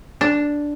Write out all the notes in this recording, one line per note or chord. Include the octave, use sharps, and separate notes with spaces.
D4